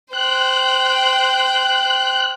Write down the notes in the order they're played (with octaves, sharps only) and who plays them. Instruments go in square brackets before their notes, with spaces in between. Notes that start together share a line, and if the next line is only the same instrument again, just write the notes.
[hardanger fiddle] C5 G5 [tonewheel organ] F#6